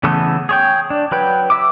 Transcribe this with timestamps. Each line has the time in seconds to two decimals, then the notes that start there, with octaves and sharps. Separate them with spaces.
0.03 C#3 E3 A3 B3 A4
0.49 G#4 C#5 G5
0.90 D4
1.12 F#3 B4 G5
1.50 E5 D6